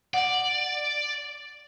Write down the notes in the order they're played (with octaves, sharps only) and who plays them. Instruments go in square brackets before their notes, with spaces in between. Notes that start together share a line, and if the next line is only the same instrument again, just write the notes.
[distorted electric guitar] D5 [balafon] F#5